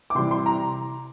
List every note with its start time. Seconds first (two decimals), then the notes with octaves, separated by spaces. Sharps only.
0.10 D6
0.15 C3 E3 G3 C6
0.31 C6
0.46 A#5